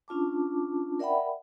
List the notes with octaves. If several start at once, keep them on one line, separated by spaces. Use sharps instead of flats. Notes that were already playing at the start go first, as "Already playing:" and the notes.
C#4 D4 F4 A5 D6
A#4 D5 E5 F#5 G5 B5